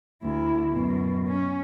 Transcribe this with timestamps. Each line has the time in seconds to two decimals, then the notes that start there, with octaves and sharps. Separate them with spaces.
0.23 D2 E4
0.72 F#2 B2
1.28 C#4